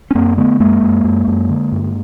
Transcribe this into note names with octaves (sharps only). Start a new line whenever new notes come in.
C#4
F#2 A#3 C4
D3 A3 B3
F#2 G#3 A#3
F#2
F#2
F#2
D3
G2